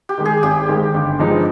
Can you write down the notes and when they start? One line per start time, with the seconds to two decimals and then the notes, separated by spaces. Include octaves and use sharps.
0.09 G4
0.18 D#3 G#3
0.25 G#4
0.43 G#1 G4
0.68 G#2 D#3 G#3
0.94 G1
1.19 G2 F3 G#3 D#4